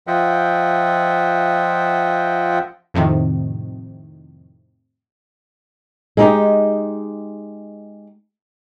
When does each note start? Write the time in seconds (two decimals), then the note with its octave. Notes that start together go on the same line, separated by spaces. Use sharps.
0.07 F3 F4 D#5 E5 F#5 G5
2.94 F2 A2 C3 D#3
6.17 G#3 D#4 G4